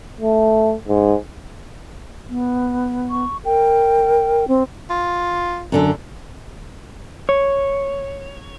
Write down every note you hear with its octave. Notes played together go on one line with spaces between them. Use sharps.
A3
G#2
B3
C#6
A#4 G5
C4
F4
F#2 D3 A4
C#5